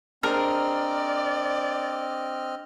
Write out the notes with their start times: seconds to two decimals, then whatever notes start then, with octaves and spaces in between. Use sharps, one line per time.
0.23 C4 D4 G#4 A#4 C5 D5 D#5 F6